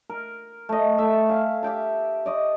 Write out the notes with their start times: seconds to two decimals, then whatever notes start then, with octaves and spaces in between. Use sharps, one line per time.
0.10 A#4
0.69 A3 D#5
0.98 A3 E5
1.29 F5 G#5
1.63 G4 E5 G5 A5
2.26 D5 D#5 C#6